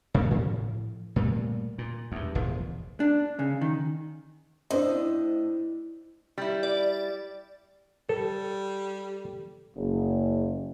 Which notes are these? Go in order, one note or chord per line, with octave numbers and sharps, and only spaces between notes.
C3 G#3 A#3
A2 F3
A#2 G3 A3
A#2
E2 G2
F1 A#1 E2 F3
D4
C#3
D#3
A2 D4 C5 D#5
G3 E4
D5
G3 A4
F#1